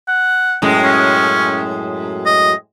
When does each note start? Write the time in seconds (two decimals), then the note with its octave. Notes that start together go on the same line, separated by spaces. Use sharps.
0.08 F#5
0.62 F#2 A2 G#3
0.83 C#4
2.26 D#5